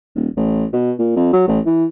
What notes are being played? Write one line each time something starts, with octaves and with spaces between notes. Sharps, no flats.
D#1
A1
B2
A#2
F2
F#3
A1
E3